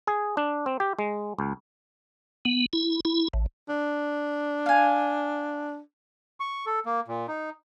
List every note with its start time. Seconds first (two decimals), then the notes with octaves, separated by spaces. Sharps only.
0.07 G#4
0.37 D4
0.66 C4
0.80 G4
0.99 G#3
1.39 C#2
2.45 B3
2.73 E4
3.05 E4
3.34 A1
3.69 D4
4.66 F5 G#5
6.40 C#6
6.66 A4
6.86 A#3
7.08 A#2
7.28 D#4